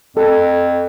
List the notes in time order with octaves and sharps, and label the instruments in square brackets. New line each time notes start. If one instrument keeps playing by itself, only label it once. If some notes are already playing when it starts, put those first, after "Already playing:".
[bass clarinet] F2 [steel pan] A4